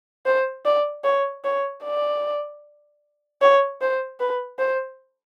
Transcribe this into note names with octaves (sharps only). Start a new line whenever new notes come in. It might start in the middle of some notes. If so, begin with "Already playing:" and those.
C5
D5
C#5
C#5
D5
C#5
C5
B4
C5